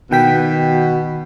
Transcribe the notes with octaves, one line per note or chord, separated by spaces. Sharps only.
B2 D#3 G5 B6